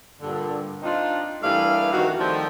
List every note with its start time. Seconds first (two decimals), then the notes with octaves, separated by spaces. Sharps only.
0.20 G2 A#2 D3
0.82 C4 D4 D#4 F4
1.43 G2 E3 A3 A#3 D5 F5
1.93 F2 D#3 E3 F#4
2.19 D#3 F3 G3 A3 C4